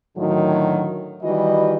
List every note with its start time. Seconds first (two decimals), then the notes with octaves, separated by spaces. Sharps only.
0.17 A2 D3 D#3 F#3
1.23 D#3 E3 G3 F#4 D#5